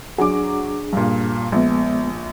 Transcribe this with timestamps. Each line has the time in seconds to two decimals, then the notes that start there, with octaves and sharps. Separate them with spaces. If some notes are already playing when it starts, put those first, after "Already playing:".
0.18 F#3 D4 G#4 D6
0.93 G2 A#2
1.52 A#1 G#3 B3